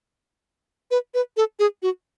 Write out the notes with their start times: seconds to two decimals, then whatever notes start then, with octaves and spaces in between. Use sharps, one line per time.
0.91 B4
1.14 B4
1.37 A4
1.59 G#4
1.82 F#4